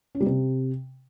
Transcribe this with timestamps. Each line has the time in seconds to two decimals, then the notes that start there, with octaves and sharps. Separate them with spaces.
0.15 C#4
0.20 G3
0.26 C3